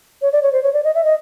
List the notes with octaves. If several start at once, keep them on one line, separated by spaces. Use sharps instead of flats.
C#5
D5
C#5
C5
C#5
D5
D#5
E5
D#5